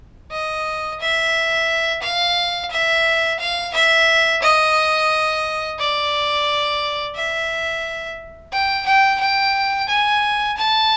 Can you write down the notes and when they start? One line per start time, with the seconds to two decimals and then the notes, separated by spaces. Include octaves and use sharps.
0.31 D#5
1.00 E5
2.02 F5
2.71 E5
3.39 F5
3.74 E5
4.42 D#5
5.79 D5
7.15 E5
8.52 G5
8.86 G5
9.20 G5
9.89 G#5
10.57 A5